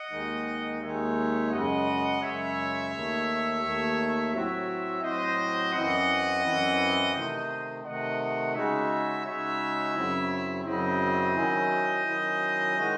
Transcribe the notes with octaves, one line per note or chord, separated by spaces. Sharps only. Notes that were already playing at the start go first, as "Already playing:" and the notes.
Already playing: D#5 F#5
D#2 D#3 G#3 D#4
D#2 D#3 G#3 D#4 C#5 E5
F#2 C#3 G#3 D#5 F#5
F#2 C#3 G#3 C#5 E5
D#2 D#3 A3
D#2 D#3 A3
A2 F#3 C4 F#4 C#5 E5
A2 F#3 C4 F#4 C5 D#5
F#2 E3 C4 E4 D#5 F#5
F#2 E3 C4 E4
C3 D#3 A3 C5 D#5
C3 D#3 A3 D#5 F#5
C#3 G#3 D#4 F#4 C#5 E5
C#3 G#3 D#4 F#4 C#5 E5
F#2 C#3 F#3 C4 E4
F#2 C#3 F#3 C4 E4 C5 D#5
D#3 F#3 C#4 E4
D#3 F#3 C#4 E4
D#3 G#3 D#4 F#4